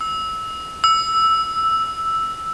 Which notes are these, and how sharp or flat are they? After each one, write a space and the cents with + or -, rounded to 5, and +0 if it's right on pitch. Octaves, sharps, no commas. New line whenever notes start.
E6 -15
E6 +0